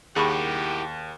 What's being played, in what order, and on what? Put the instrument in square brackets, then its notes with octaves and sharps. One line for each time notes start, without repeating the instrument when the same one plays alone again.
[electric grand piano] D#2 [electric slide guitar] E4 A#4 F#5 [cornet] G4 [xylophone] G#4 B5 C#6